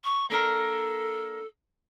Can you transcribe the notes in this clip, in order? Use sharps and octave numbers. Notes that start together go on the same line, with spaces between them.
C#6
A#3 D4 A4 A#4